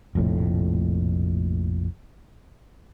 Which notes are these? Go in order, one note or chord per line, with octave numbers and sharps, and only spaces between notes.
F1 A#1 F2 A2